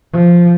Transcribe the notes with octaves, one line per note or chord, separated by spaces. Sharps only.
F3